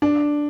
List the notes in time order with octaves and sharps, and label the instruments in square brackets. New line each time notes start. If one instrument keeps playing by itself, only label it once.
[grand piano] D4